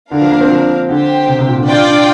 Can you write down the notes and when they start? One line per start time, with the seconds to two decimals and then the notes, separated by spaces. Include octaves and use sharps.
0.11 D3 D4 A#4 F5
0.21 F3
0.31 A#3
0.41 C4
0.50 F3
0.89 D3 G4 C5 G5
1.28 C3
1.39 C3
1.48 A#2
1.57 D3
1.67 D4 F4 D5 G5
1.87 D4